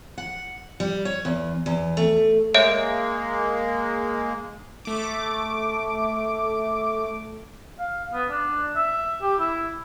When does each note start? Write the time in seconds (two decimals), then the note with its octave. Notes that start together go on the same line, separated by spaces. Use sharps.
0.18 F#5
0.80 G3
1.05 C#5
1.25 E2
1.66 E2
1.97 A3
2.54 G#3 A#3 C#5 E5 D7
4.85 A3 D6
7.79 F5
8.13 B3
8.30 D4
8.76 E5
9.22 G4
9.39 E4